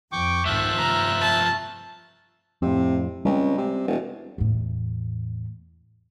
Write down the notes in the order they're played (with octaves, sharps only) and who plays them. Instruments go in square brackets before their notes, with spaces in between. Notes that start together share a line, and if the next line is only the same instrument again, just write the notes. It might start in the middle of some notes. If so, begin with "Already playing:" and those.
[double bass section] F2 [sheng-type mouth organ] G5 C#6 D6
[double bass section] C2 G#2 D#3 [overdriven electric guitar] F3 A3 [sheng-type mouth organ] E5 F#6
[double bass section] F1 G2 [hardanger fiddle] A#5
[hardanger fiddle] A5
[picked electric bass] F2 A2 [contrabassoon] C3
[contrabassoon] C#2 [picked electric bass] G3 A#3 C4
[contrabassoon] C3
E1
[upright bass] E2 A2